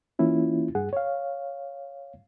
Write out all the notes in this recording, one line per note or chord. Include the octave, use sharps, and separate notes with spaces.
E3 A#3 C#4 E4 F4
G2 G#4 F#5
C#5 F5